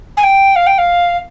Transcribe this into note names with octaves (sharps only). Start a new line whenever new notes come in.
G#5
G5
F5
G5
F5